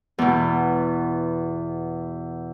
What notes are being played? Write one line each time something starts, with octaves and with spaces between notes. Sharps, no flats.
E2 B2